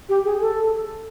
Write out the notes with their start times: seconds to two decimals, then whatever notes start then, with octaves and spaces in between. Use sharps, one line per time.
0.09 G4
0.24 G#4
0.40 A4